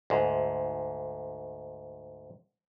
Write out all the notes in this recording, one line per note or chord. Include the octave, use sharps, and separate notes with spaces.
D2 G#2